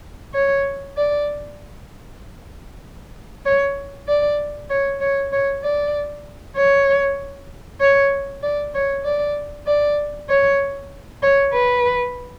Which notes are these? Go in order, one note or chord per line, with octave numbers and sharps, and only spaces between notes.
C#5
D5
C#5
D5
C#5
C#5
C#5
D5
C#5
C#5
D5
C#5
D5
D5
C#5
C#5
B4